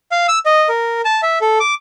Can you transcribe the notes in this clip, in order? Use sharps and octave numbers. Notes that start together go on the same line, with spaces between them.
F5
E6
D#5
A#4
A5
E5
A4
D6